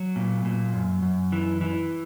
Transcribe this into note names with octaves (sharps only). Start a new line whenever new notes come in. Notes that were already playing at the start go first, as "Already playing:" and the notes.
Already playing: F#3
A#2
A#2
F#2
F#2
E3
E3